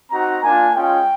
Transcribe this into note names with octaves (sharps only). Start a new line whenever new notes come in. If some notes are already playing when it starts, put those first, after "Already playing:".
C4 D#4 F#4 A#5
A#3 D4 F4 G#5
G#3 C#4 F4 G5